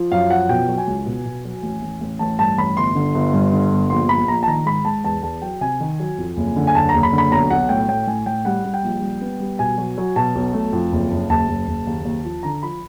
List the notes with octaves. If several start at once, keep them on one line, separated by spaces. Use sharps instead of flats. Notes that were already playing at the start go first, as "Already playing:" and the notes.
Already playing: F3
F#2 F5
F3 F#5
B2 G5
F#3
G#5
C#2
B2
B2
F#3
A1
A1
A1
A1 A5
G2 A5
A1 B5
G1 C6
D3
G1
G2
D3
G1
A#1 C6
A#1 B5
A#1 A#5
A5
D#3 A#5
G#2 B5
G#2 A5
E2 A5
E2 A5
F#3 G5
C3 G#5
D#3
F#3
F2
F#1
D3
G#5
F#1 A5
A#5
F#1
B5
D3
B5
B1 A#5
B1 F#5
A2 G5
A2 G5
A2 G#5
A2 G5
G3 F#5
G3
G5
A#1
G3
B3
G3
B2 G#5
F#3
F#3
B2 A5
B1
A3
F2
F#1
F#1
F#1 A5
F#1
F#1
D#2
D#2
F3
D3 A#5
F3 B5